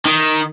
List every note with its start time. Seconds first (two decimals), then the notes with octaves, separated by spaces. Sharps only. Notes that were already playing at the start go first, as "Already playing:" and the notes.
0.05 D#3